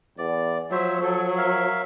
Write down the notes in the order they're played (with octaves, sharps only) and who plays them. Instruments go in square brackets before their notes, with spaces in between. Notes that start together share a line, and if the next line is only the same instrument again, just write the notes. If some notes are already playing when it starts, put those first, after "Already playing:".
[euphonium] E2 [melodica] D5
[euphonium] F3 [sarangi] F#3 [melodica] C5 C#5 E5
[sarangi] F#3 [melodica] A4
[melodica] A#4 E5 F5